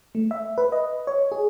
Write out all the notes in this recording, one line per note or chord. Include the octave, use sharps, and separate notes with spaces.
A3
E5
B4
D#5
C#5
G#4